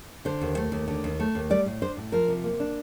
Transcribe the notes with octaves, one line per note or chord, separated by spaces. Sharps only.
D3 C5
D#2
A3
D#2
D3
D#2
A3
D#2
G3 D5
A2
D4 C5
A2
F3 A#4
C3
A#3
D4